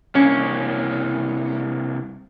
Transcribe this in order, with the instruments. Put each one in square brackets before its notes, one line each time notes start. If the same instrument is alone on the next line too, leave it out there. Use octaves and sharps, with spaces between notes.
[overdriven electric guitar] C2 A#3 [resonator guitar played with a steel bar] C#4